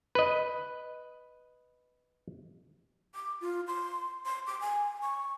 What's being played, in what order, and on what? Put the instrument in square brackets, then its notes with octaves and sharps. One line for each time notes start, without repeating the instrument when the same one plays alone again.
[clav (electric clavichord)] B4 D#5
[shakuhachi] D6
F4
C6
C6
D6
G#5
C#6